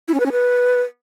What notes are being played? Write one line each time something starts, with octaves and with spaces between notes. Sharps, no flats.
E4
C#4
B4
C#4
B4